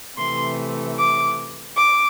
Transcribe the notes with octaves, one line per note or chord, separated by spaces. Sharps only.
C3 E3 A3 C6
D6
D6